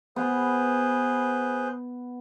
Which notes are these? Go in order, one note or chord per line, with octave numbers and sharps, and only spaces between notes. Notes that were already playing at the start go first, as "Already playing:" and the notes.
B3 G#4 B4 C5